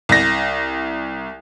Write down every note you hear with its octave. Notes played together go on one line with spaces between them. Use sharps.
C2 A#6